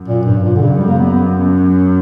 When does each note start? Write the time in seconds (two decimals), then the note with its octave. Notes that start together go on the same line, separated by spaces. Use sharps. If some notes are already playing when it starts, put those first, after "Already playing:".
Already playing: F#2
0.08 A#2
0.26 G2
0.44 A#2
0.56 D3
0.62 F#2 C#3
0.78 G3
0.88 A#3
0.98 B3
1.33 C#4